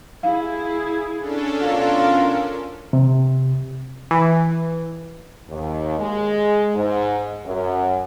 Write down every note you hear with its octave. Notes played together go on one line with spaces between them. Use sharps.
E4 G#4 F5
C#4 D4 A4
B2 F4 A#4
C3
E3
D#2
G#3
G#2
F#2